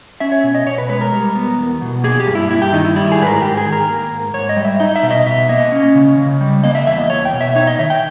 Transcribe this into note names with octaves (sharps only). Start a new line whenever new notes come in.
C#4 E5
C#5
B2
D#5
B2 C#5
B4
G#3 B4
A#4
G3
B3
E2
B2
A#3 G#4
G4
G2
E4
G2 E4
G4
D#3 D#4
E4
G3 E4
G#4
G#2 B4
A#4
G#2 G4
G#4
D#3
A#4
A#3
G#2
G#2 C#5
D#5
G3
E5
D#4 D#5
E5
B2
D#5
B2 E5
A#3 D#5
C#4
C#3
C#3
G3
A#3 D#5
E5
E2 E5
D#5
E2 C#5
G5
B2
E5
D#4 C#5
D#5
D#3 E5
G5